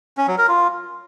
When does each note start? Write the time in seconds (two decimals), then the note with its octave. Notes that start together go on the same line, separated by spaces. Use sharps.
0.17 C#4
0.28 F#3
0.38 A#4
0.48 F4